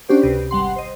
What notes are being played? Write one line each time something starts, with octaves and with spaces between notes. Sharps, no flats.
C#4 D4 F#4 G4 C5 D5
C#2 C3 G4 B4
G#1 G3 F#5 C6
C5 D#5